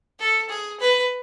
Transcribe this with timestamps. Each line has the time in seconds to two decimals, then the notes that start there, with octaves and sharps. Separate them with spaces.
0.20 A4
0.50 G#4
0.80 B4